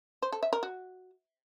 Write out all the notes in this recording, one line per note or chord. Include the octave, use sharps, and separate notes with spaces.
C5
A4
E5
A#4
F#4